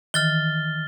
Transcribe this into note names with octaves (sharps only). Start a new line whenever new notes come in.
D#3 E3 F6 A6 G7